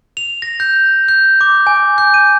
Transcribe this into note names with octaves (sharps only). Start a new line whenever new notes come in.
F7
A#6
G6
G6
D6
G#5
G6
D#7